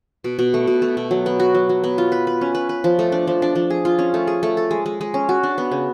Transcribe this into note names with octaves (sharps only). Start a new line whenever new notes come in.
B2
B2
A3
B2
A3
B2
F#3
B3
F#4
F#3
F#3
B3
F4
B4
B4
C#4
B4
B4
F3
A3
D4
F3
D4
F3
G#4
F4
C#4
A3
G#4
A3
A4
G#3
G#3
G#3
C#4
F#4
D4
B3
C#3